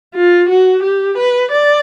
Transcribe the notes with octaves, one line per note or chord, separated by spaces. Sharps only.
F4
F#4
G4
B4
D5